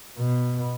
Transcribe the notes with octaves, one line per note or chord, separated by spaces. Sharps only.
B2